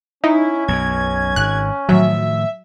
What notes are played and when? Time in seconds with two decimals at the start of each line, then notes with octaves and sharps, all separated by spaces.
0.24 C#4 D#4 E4
0.68 B1 F#2 B2 G#6
1.36 G#1 G#2 F#6
1.89 A2 D#3 F3 F#3 E5